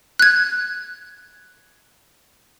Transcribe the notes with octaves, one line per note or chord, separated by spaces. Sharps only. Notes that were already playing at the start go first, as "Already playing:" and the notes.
F#6 G#6